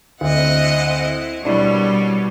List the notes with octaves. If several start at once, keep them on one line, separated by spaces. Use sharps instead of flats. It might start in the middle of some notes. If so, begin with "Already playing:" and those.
D2 C4 E4 D#5 F#5
B2 G3 D4 E4 A#4 C#5